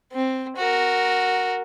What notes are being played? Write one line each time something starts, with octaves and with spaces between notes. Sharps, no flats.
C4
F#4 A#4